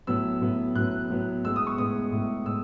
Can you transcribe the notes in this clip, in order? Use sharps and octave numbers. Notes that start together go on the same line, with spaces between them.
A2 F#3 B3 E6
A2 F#3 B3
A2 F#3 B3 F#6
A2 F#3 B3
A2 G#3 B3 E6
D#6
C#6
A2 G#3 B3 D#6
A2 G#3 B3
A2 G#3 B3 E6